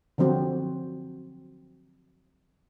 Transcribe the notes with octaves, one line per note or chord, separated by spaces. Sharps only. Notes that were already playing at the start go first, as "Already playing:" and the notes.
D3 F3 F#3 C4 F#4